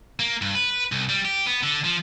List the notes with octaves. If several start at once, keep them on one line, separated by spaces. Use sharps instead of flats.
A#3
G2
B4
C2
G3
G4
B3
D3
F3